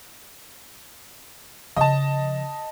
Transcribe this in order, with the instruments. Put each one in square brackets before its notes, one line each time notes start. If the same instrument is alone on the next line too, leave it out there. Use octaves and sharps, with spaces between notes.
[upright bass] C#3 F3 [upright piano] D#5 A5